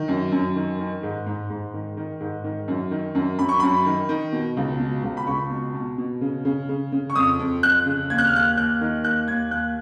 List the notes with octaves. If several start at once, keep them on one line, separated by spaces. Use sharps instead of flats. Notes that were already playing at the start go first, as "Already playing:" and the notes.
Already playing: D#3
F#2
F#2
D#3
D#3
G#2
G#2
G#2
D#3
D#3
G#2
D#3
F#2
D#3
F#2
F#2 B5
C#6
F#2 B5
D#3
D#3
B2
C#2
B2
C#2
B5
C#2 C#6
B2
B2
B2
C#3
C#3
C#3
C#3
C#6
F2 D#6
F2
F2 F#6
C#3
D#2 G#6
F#6
F6
D#2 F#6
D#2 F#6
D#3
D#2 F#6
D#2 G#6
D#2 F#6